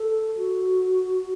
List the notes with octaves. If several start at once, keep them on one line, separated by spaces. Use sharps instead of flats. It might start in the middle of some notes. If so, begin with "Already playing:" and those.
Already playing: A4
F#4